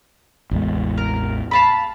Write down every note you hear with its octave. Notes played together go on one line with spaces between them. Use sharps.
A1 E2 G#3
A#4
F5 A5 B5